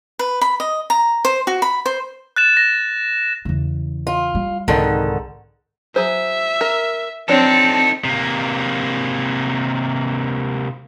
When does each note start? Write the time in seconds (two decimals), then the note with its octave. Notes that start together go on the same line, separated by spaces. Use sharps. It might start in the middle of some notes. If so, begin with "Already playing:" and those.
0.19 B4
0.41 B5
0.60 D#5
0.90 A#5
1.25 C5
1.47 F#4
1.62 B5
1.86 C5
2.36 F#6 A6 E7
2.57 A#6
3.45 E2 C#3
4.07 F4
4.35 G3
4.68 C2 G#2 D3 D#3
5.96 F#3 G#4 C5 E5
6.61 A#4
7.28 F3 C4 D4 D#4 A4 C#5 A5
8.05 C3 A#3